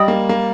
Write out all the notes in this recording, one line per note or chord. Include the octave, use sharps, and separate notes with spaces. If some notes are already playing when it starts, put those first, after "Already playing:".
Already playing: G3 D#5 G5 D#6
A#3
A#3